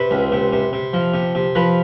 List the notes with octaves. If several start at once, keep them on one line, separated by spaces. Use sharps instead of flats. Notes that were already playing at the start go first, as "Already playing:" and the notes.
Already playing: C3 B4
C#2
C3
C3
C3
F3
C3
C3
F3 B4